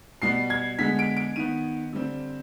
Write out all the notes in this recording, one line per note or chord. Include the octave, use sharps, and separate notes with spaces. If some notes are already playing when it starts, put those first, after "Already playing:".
B2 G3 B3 C7
G#6
D3 G#3 B3 B6
D7
D7
D#3 B3 D#7
D3 G3 C4